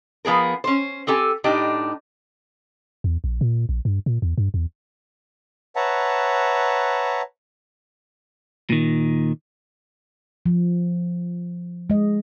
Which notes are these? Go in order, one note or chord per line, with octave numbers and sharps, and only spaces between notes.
F3 B3 G#4 A#4
C#4 C5
C4 G4 A4 G#5
A2 D4 D#4 G4
E2
A#1
A#2
A#1
G2
A#2
E2
G2
E2
B4 C#5 E5 F#5 A5 A#5
A#2 D#3
F3
G#3 D#5